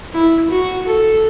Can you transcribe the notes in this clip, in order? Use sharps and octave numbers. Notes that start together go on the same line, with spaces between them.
E4
F#4
A4